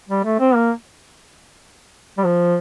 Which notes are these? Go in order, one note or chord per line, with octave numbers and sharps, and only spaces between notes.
G3
A3
C4
A#3
G3
F3